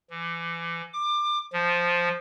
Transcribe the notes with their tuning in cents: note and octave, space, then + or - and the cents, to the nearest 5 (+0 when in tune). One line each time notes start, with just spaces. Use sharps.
E3 +35
D6 +25
F3 +0